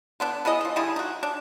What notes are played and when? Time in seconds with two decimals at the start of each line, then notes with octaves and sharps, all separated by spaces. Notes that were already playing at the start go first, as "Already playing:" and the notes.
0.20 D3 B3 D4
0.45 B3 E4 G#4 D#5
0.61 E3 F3
0.76 D3 G3 E4 G#4
0.96 D#4 F#4
1.23 D4